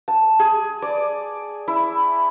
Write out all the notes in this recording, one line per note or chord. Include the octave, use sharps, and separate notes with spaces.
A5
G#4
D5
E4